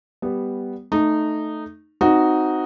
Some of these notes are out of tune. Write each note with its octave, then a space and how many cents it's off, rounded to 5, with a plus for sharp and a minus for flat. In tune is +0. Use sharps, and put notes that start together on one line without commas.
G3 +0 B3 +0
A3 +0 D#4 -15
C4 -15 D#4 +0 F#4 +0